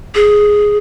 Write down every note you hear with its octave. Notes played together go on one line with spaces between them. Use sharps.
G#4